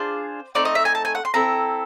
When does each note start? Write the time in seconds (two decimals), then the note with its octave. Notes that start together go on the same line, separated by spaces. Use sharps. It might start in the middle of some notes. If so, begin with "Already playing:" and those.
Already playing: D4 F4 G#4 C5
0.55 A3 C4 D#4 D5
0.65 D#5
0.75 E5
0.85 G#5
0.95 A5
1.05 G#5
1.15 F#5
1.25 C6
1.34 C4 E4 A4 A#5